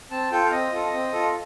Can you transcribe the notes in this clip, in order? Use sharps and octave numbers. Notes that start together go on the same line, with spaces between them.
C4 A5
F4 A4 G5
F5
C4 D#5
F4 A4
C4
F4 A4